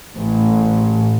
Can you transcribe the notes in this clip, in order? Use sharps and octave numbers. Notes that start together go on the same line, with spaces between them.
A1